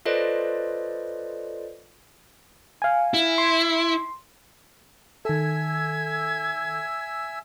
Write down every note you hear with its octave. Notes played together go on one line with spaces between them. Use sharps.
F4 A4 B4 C5 D5 D#5
F5 G#5
E4
C6
D#3 A4 E5 G#5 E6 G#6